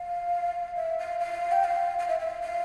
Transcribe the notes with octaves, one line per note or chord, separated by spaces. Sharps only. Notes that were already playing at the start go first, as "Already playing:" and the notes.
Already playing: F5
E5
F5
F5
G5
F5
F5
E5
E5
F5
F5